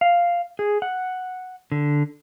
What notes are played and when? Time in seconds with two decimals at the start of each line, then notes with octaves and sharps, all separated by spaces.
0.01 F5
0.59 G#4
0.82 F#5
1.72 D3